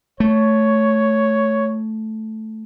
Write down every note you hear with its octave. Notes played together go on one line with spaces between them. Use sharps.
A3 C#5